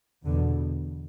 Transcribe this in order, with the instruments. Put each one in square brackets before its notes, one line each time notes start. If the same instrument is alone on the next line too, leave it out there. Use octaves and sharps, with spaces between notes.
[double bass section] E2 B2 D3